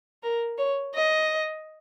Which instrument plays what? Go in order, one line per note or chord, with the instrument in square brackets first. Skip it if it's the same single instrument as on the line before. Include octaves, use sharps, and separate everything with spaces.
[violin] A#4
C#5
D#5